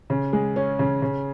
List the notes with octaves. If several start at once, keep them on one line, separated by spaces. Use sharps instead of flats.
C#3
G#3
C#4
C#3
C#3